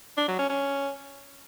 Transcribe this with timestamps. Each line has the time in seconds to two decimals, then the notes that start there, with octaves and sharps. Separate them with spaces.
0.17 D4
0.28 F#3
0.39 C#4
0.49 C#4